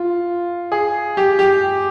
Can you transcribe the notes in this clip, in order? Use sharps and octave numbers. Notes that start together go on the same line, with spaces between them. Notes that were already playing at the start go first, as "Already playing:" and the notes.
Already playing: F4
G#4
G4
G4